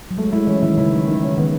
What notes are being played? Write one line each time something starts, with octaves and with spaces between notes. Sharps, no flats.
F#3
G#3 A3
G#3 E4
E3 C#4
D#3 E4
C#3 E4
D#3
D#3
C#4
D#3 B3